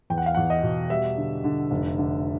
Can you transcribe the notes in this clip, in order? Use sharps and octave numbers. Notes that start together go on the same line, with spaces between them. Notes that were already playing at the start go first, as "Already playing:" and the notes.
E2 G5
F#5
F5
E2 F#5
D#5
B2
G3 E5
D3
D3
F1
D3